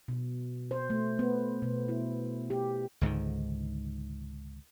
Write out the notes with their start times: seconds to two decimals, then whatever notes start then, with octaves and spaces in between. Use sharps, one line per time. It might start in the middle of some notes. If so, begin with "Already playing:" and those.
0.08 B2
0.71 C5
0.90 A3
1.19 B3
1.62 B2
1.88 E4
2.50 G4
3.01 C#2 G#2 D3 D#3